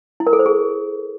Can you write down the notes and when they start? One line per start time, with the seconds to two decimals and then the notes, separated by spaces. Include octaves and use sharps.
0.20 E4
0.27 A#4
0.33 A4
0.39 C5
0.46 G#4